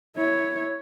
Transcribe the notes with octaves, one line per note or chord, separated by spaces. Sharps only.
E4 C#5